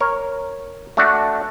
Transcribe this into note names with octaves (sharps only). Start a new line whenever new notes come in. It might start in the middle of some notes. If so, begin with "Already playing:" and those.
A#4 C#5
A3 D4 F#4